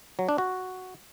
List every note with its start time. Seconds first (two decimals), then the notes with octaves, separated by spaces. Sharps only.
0.19 F#3
0.29 D4
0.38 F#4